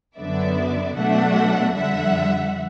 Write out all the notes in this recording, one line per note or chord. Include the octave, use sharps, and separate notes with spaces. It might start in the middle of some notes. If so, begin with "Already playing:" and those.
F#2 D3 F#3 B3 D5 E5
B2 F#3 A3 D4 E5 F#5
F2 D3 G3 E5 F#5